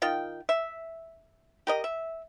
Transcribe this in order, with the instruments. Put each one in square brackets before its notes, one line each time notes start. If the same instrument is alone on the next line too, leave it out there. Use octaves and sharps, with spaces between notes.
[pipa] D#3 F4 G5
E5
G4 A#4 D#5
E5